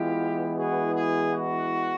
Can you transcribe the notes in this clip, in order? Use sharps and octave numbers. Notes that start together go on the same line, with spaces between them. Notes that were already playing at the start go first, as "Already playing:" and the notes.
Already playing: E3 G#3 B3 E4 F4 G4
F#4 G#4
F#4 G#4
F#4